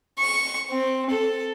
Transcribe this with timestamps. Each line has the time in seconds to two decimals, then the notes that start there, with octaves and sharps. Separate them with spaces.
0.19 C#6
0.71 C4
1.10 A4